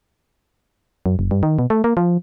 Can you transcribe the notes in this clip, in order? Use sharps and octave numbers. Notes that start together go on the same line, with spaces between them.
F#2
F#1
G2
D#3
B2
A3
A#3
F3